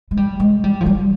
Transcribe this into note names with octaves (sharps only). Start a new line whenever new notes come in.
G#3
G3
G#3
G3
F3
G3